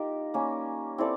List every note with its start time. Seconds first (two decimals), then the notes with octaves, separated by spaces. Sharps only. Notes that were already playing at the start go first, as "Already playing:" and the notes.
Already playing: A#3 D#4 F4 G4 A#4 D#5
0.34 G3 A#3 C#4
0.98 C4 E4 A4 D5